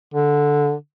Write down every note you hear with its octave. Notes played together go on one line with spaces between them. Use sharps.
D3